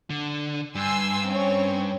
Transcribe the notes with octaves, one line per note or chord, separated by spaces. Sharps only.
D3
G2 G#5 C6 E6
C4 C#4 C#5